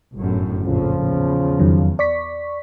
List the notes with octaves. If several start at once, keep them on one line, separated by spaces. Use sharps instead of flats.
G1 F#2 A2
A#1 F2 A2 C#3 F3
E2
F2 D#3 F#3
D5 C#6 B6